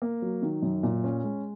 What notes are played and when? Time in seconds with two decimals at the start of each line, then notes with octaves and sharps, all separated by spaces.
0.02 A#3
0.22 F#3
0.42 D#3
0.62 F#2
0.83 A#2
1.04 C#4
1.24 G#3